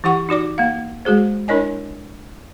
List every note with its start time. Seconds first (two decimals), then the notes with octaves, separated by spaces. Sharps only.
0.04 E3 E4 G4 F#5 C#6
0.29 D#4 F#4 D5 D6
0.58 A#3 F5
1.05 G#3 F#4 G#4 C5
1.48 D4 E4 A#4 C#5 D#5 G#5